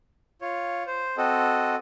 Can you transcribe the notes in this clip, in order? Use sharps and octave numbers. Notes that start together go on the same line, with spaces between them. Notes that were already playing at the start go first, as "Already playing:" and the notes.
F4 C#5
C5
C4 F#4 A4 D#5